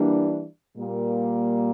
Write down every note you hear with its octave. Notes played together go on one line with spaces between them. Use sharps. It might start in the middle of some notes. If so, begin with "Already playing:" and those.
Already playing: E3 G3 A#3 D4
A#2 G3 A#3